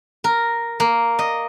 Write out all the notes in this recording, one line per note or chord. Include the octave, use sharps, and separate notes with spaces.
A#4
A#3
D#5